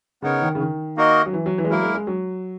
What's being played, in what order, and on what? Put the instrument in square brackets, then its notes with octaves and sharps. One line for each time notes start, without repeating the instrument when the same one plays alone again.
[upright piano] C#3 [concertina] B3 D#4 A#4 C#5
[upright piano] D#3
C#3
D#3
[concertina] A#3 D#4 F#4 A#4 D#5
[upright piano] F#3
E3
F#3
E3
G#3
[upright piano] F#3 [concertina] A#3 E4 A#4
[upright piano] G#3
G#3
F#3